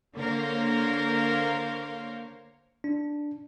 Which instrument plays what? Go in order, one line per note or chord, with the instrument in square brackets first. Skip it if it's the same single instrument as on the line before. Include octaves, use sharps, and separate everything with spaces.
[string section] D3 A#3 A#4 C5 C#5 F5
[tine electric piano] D4